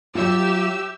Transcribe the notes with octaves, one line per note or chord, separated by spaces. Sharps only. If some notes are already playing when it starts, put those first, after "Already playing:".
F#3 F4 G4 E5 E6